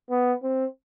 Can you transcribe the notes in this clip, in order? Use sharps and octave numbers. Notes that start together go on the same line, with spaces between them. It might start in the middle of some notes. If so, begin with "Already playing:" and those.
B3
C4